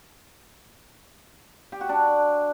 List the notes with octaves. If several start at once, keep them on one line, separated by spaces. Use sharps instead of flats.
G4
F#4
D4